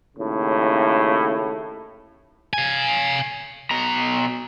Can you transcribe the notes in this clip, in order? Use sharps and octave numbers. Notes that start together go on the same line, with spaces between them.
D#2 A2 C#3
F5 G#5
B2 A#5